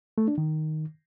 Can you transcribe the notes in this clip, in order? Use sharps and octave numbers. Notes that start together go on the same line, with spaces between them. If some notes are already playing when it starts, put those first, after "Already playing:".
A3
D4
D#3